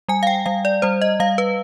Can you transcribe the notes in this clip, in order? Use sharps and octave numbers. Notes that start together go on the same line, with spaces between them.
G3 G#5
F5
G5
G3 F5
D5
G3 C5
D#5
G3 F5
B4